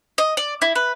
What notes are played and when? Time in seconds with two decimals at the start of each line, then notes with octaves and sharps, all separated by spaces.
0.18 D#5
0.37 D5
0.62 E4
0.76 B4